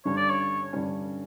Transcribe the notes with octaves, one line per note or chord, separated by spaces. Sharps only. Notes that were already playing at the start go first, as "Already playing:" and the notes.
G2 D3 G3 C#4 C#5
D5
C#5
G2 D3 G3 C#4